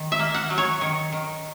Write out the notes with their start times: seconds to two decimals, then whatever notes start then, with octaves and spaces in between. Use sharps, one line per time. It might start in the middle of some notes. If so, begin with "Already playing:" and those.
Already playing: D#3
0.12 E5
0.19 A#3
0.34 F#5
0.50 F#3
0.58 C#5
0.81 D#3
1.13 D#3